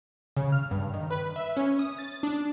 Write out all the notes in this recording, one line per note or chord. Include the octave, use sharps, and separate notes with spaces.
C#3
F6
G2
D#3
B4
E5
C#4
D#6
A6
D4